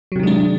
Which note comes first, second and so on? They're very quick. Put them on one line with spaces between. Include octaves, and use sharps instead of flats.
F#3 C3 D#3 G#3 D4